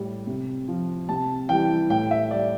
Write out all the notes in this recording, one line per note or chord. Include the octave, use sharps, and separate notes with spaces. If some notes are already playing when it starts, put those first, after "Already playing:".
Already playing: A2 G3
C3
F3
C3 A5
E3 G3 G5
A2 G5
E5
G3 D5